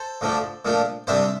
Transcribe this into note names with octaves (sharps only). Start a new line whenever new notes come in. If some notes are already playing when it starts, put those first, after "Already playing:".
Already playing: A4 C5
D2 D3 F3 A3 D4
A#2 F3 A3 D4
C2 C3 G3 D4 C5 E5